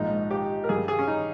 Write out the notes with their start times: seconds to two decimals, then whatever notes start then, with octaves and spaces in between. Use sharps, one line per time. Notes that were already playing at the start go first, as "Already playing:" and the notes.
Already playing: A#1 G#2 F3 G#3 D#4
0.31 G4
0.64 A#4
0.69 G2 G3 G#4
0.88 G#4
0.99 C#4
1.08 D#4